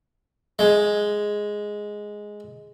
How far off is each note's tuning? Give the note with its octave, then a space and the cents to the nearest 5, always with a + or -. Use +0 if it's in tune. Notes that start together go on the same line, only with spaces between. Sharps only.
G#3 +0